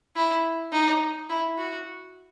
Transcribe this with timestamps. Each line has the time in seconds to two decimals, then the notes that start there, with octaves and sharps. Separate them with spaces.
0.16 E4
0.72 D#4
1.30 E4
1.58 F#4